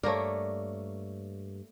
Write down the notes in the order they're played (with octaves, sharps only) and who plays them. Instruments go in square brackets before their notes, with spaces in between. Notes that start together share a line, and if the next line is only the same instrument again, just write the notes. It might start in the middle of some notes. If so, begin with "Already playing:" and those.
[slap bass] G2 [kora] A3 A#3 A#4 [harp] C#5 D5